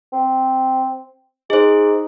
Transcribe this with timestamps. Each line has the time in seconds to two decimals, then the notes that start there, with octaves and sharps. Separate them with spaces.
0.13 C4
1.50 D#4 G#4 C5